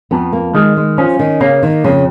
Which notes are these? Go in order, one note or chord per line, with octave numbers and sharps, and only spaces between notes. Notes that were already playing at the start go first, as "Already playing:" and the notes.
F2 B3
A#3
D#3 G#3
G#3
F3 C#4
D#3
C#3 A#3
D#3
F2 C#3